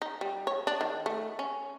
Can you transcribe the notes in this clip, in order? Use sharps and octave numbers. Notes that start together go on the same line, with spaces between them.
D#4
G3
C#5
D4
D#3
A3
C#4